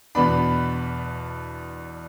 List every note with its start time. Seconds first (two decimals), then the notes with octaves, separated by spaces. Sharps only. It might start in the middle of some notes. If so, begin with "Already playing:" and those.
0.15 E2 B2 B3 D4 B5